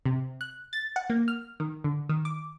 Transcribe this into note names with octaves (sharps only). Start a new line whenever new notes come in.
C3
F#6
A6
F#5
A#3
F6
D#3
D3
D#3
D6